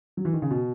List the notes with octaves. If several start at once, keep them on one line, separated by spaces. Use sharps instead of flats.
F#3
E3
D#3
C#3
B2